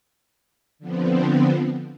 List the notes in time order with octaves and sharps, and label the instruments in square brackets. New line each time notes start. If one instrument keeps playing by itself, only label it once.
[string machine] D3 F3 B3 C4